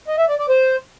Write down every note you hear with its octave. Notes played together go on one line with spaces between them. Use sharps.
D#5
E5
D5
D5
C5